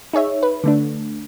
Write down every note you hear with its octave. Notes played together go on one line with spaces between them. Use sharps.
D#4 G#4 C#5 E5
B4
D3 A3 D4